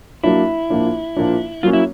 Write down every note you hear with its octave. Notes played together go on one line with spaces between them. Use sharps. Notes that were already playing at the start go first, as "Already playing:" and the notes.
F#3 A#3 D4 E4
A#2 F3 A#3 D4
A#2 F3 A#3 D4
F#3 A#3 C#4 F4
E4